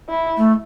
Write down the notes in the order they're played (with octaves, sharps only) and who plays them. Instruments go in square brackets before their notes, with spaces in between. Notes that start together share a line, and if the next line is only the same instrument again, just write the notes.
[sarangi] E4
[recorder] A3